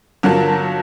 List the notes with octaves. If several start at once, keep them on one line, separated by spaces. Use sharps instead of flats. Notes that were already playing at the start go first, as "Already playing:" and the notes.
G1 F#3 F4 F#4 A#4 A5